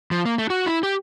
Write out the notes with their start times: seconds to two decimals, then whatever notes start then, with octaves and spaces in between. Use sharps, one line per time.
0.11 F3
0.26 A#3
0.38 A3
0.50 F#4
0.66 E4
0.83 G4